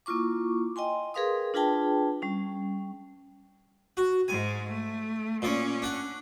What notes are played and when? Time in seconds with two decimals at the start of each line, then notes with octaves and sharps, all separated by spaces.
0.06 A#3 E4 F4 C#6 D6
0.76 D#5 G5 G#5 C6
1.14 G#4 A#4 B4 F5 C6 D#6
1.54 D4 F4 G#4 B4 G5 A5
2.22 G3 C#4
3.97 F#4
4.28 G#2 G#3 G#5
4.68 A3
5.42 A#2 C#4 D5
5.82 D4 F#5